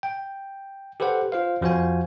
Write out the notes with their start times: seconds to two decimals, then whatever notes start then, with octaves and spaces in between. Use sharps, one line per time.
0.03 G5
1.00 G4 A4 B4 C5 F#5
1.32 F4 C5 F5
1.61 F2 F3 F#4 C5 F5 G#5